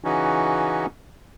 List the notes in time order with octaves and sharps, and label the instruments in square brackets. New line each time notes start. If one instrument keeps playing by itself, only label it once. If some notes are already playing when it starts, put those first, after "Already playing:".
[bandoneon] C#3 E3 C#4 D#4 F#4